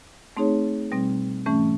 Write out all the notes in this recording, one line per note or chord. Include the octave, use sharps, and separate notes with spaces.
A3 C4 D#4 G#4 C#5
B2 G3 C4
G#2 E3 A3 C#4